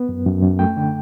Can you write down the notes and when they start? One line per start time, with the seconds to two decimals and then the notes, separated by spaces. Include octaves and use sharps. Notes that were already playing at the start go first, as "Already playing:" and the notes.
Already playing: B3
0.09 F#2
0.25 F#2
0.43 F#2
0.59 A3 G5
0.77 D3